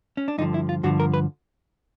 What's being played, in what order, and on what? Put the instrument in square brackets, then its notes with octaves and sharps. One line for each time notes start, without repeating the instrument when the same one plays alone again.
[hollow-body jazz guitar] C#4
D4
G2 D3 F3 D#4
E4
F4
G2 D3 F3 F#4
A#4
B4